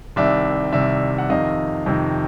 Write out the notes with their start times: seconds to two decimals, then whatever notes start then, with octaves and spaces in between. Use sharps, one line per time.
0.16 C2 C3 D#3 D5 E5
0.73 C2 C3 D#3 D5 E5
1.18 F#5
1.29 F2 C3 D#3 D#5 F5
1.86 F2 C3 D#3